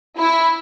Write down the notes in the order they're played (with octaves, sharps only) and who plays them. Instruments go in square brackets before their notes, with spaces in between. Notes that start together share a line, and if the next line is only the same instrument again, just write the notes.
[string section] E4